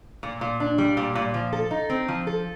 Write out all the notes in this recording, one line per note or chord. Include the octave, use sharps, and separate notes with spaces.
A#2
A#2
D4
G3
A#2
A#2
F3
A4
D#4
C4
F3
A4